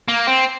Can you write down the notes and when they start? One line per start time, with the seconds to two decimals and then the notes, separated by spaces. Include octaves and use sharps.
0.08 A#3
0.27 C4